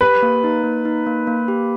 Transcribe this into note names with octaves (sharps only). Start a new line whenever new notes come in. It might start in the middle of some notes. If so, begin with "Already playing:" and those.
G4 B4
A#3
D#4
A#3
D#4
A#3
A#3
G4